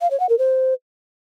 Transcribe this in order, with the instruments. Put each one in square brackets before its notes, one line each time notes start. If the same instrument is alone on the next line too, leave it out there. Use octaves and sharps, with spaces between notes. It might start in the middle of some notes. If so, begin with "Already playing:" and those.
[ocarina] F5
C#5
F#5
A#4
C5